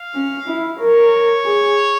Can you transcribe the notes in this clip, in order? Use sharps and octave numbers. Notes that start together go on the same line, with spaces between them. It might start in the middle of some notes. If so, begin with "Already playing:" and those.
Already playing: F5
C#4
E4
A#4 C#5
G#4